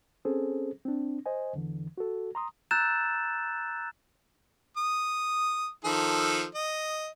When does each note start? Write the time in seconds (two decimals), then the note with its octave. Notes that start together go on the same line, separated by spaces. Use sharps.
0.25 C4 C#4 G#4 A4 C5
0.85 C4 D4
1.26 C5 D#5 G#5
1.53 E2 D3 E3
1.98 F#4 A4
2.35 A#5 C6 D#6
2.71 A#5 E6 F#6 G6 A6 E7
4.77 D#6
5.84 D#3 F3 A4
6.55 D#5